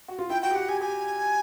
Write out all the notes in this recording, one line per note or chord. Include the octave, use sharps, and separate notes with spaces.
F#4
F4
E4 G5
F#4 G5
G4
F#4 F#5
G4 G#5
G4 G#5